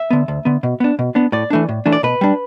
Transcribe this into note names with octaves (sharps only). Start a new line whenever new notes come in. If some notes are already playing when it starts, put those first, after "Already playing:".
Already playing: E5
D3 B3
D2
D3 B3
B2
B3 D4
B2
B3 D4
A2 D5
E3 A3 D4
A2
E3 A3 D4
D5
B2 B4
G3 D4